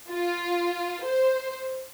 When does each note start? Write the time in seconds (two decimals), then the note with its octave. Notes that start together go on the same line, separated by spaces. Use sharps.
0.11 F4
1.05 C5